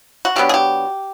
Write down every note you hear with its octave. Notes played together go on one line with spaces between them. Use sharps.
F#4
B2 F#3 B3 D4 G4
G#4
G4